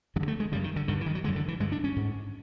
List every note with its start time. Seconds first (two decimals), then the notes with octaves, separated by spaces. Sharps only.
0.16 G2 F3
0.20 D3
0.28 A3
0.40 G#3
0.52 F#2 C#3 G3
0.64 D#3
0.76 D3
0.88 G2 D3 D#3
1.01 E3
1.06 D#3
1.15 F#3
1.24 D3 G#3
1.28 F#2
1.36 D3
1.48 E3
1.60 G2 G#3
1.63 D3
1.72 D4
1.84 C#4
1.96 G#2